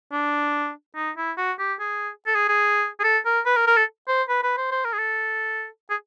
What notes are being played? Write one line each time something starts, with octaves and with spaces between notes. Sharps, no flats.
D4
D#4
E4
F#4
G4
G#4
A4
G#4
G#4
G#4
A4
A#4
B4
A#4
A#4
A4
C5
B4
B4
C5
C5
A#4
G#4
A4
G#4